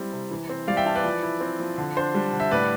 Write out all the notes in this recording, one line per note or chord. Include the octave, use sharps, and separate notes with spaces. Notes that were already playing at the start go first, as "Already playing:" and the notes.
Already playing: G3 C4 E4
C3
E3
C4
G3 D5 F5
E5 G5
E3 F5 A5
B4 D5
F3
E4
C4
F3
D3
D4 C5
G3
D3
E5
A2 B4 D5